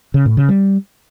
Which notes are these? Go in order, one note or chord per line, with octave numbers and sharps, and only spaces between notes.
C#3
A2
C#3
G3